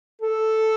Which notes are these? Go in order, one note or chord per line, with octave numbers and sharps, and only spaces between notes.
A4